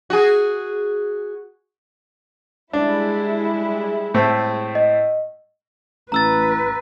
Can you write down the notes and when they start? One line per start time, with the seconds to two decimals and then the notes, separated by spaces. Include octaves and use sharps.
0.10 F#4 G#4
2.73 G3 G#3 D4 E4
4.14 A2 A3 C4
4.75 D#5
6.12 A1 B4 A#5 E6 A6